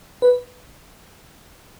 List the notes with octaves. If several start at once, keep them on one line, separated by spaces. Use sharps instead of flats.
B4